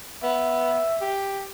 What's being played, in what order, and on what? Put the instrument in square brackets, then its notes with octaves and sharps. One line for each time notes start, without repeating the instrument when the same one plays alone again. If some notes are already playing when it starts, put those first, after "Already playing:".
[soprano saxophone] B3 [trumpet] E5
[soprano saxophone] G4